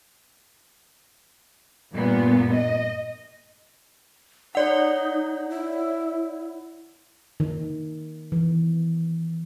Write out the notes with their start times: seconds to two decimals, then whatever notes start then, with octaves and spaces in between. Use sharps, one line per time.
1.93 G2 A#2 B3
2.55 D#5
4.55 D#4 C#5 D5 F#5
5.50 E4
7.40 D#3
8.32 E3